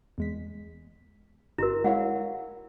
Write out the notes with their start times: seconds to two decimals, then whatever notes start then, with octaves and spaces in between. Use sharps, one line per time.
0.18 E2 G#3 B6
1.58 G1 E4 F#4 A#4 E7
1.84 G#3 E4 C#5 F5 F#5